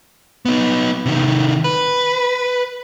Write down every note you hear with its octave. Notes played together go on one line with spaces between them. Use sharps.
B3 D#4
C3 D#3
B4